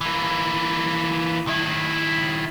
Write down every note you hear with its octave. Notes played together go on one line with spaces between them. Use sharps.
E3 A#3
D#3 E4